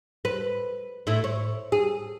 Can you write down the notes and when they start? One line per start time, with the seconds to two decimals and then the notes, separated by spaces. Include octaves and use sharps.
0.25 B4
1.07 A2 A3 E4
1.24 C#5
1.72 G#4